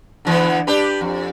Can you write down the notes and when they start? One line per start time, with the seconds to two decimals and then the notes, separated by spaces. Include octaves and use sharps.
0.25 D3 E3 B3
0.67 D4 G4 B4
1.01 F2